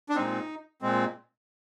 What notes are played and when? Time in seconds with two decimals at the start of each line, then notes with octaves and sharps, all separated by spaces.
0.09 D4
0.15 A#2 G#3 C4 D#4
0.82 A#2 G#3 C4